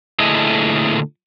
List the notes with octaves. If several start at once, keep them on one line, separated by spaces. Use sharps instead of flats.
A#2 D3 A3 E4 G#4 D#5